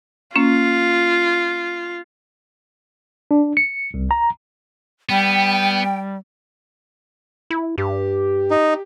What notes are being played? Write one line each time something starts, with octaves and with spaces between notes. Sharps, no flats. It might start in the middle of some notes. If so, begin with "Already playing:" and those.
A#3 C#4 F4
D4
C#7
C2
A#5
G3 B3 G5
E4
G2 G4
D#4